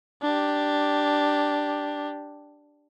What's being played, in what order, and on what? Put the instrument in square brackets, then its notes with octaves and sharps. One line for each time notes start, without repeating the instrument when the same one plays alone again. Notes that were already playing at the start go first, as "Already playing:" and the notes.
[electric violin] D4 G4